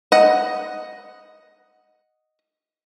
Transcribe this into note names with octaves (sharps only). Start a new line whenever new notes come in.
D#5 F#5